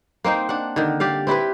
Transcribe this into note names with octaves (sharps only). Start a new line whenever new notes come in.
A#3 C4 D#4 C5
D4 F#5
D3 D#3
G4 D5 F5
C4 E4 G4 B4